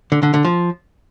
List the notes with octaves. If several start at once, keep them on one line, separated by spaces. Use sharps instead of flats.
D3
D3
D3
F3